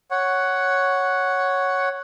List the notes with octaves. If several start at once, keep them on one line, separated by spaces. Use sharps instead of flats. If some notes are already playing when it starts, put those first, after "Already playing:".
C#5 F#5